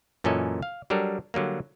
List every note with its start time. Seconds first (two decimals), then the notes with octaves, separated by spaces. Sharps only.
0.24 F#2 A#2 E3 C#4 A4 D#5
0.62 F5
0.90 F#3 G3 D4 A4 A#4
1.34 D3 F#3 G3 A#3